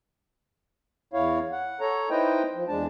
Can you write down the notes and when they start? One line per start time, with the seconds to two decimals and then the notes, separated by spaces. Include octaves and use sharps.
1.13 E2 E4 C#5 F5
1.52 F#5
1.80 A4 C#5 A#5
2.10 D#4 E4 B4 C5 D#5 G5
2.55 F3
2.68 E2 G#3 D4 A5